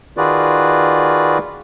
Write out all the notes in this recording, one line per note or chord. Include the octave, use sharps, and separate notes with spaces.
D#3 F4 F#4 G#4 B4 D5